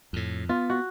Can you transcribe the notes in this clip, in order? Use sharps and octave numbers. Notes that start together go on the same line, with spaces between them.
F2 A2
B3 F4
F#4